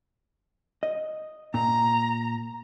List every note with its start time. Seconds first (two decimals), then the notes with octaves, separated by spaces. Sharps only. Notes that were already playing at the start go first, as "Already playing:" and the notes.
0.83 D#5
1.54 A#2 A#5